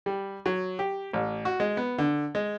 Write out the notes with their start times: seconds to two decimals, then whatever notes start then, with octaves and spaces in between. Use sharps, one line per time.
0.06 G3
0.46 F#3
0.79 G4
1.13 A1
1.45 F#4
1.60 G#3
1.77 B3
1.98 D3
2.35 G#3